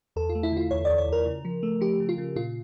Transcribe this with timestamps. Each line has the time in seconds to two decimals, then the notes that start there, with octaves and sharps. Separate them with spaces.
0.16 E2 A4
0.29 F4
0.35 A3
0.43 E4
0.52 D3 F4
0.71 E2 C#5
0.85 E2 D5
0.98 C#5
1.08 E2 A#4
1.26 C#3
1.45 F3
1.63 A3
1.81 F3 G4
2.00 C#3
2.09 F4
2.18 C#3
2.36 A#2 F4